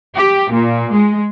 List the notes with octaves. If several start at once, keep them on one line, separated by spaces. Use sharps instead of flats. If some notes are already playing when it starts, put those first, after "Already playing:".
G4
A#2
G#3